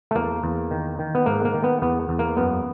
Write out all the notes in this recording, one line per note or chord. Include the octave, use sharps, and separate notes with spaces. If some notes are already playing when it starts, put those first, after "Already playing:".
A3
E2 A#3
E2
D#3
D#3
B3
G#2 A#3
A#3
D#3
B3
E2 B3
E2
A#3
F#2 B3